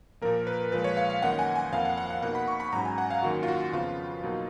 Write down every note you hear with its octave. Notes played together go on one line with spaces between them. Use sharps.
A#2 F3 A#3 A#4
B4
A#2 F3 G#3 B4
C#5
F5
F5
F#2 D#3 A#3 D#4 F#5
G#5
G#5
F2 F3 A#3 F5
F#5
F#5
F#5
B2 A#3 D#4 F#5
B5
C#6
B5
G#2 F#3 C#4 A#5
G#5
F#5
F5
F#2 D#3 A#3 D#4 F#4
F4
F#4
F2 C#3 F3 B3 F4
B2 F#3 A#3 D#4